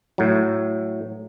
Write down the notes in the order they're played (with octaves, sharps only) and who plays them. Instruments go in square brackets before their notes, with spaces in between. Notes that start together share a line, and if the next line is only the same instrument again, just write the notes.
[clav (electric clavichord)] A2 F#3